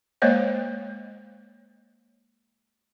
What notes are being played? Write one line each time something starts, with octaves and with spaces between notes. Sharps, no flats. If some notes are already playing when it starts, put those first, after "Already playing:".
G#3 A#3 C5 C#5 D#5